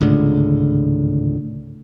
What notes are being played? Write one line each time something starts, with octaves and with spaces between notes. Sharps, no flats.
G#1 C#2 A2 D3